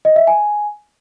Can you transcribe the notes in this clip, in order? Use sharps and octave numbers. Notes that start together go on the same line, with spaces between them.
D#5
E5
G#5